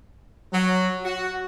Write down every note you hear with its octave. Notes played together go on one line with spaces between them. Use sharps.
F#3
F#4